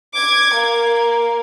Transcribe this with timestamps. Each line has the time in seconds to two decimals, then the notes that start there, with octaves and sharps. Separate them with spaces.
0.14 D6 G#6
0.54 A#3